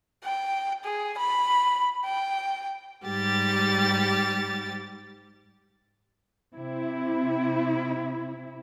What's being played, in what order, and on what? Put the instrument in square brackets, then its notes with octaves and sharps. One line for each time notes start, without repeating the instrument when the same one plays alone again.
[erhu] G5
G#4
B5
G5
[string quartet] G#2 G3 G4 A6
[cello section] C3 E4